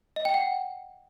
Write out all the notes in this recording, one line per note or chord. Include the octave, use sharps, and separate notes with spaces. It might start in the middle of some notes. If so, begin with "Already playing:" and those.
D#5
G5
F#5